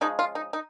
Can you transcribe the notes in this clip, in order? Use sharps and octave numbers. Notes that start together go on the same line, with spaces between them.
C#3 F3 G#3 D#4
F4
D#4
D#4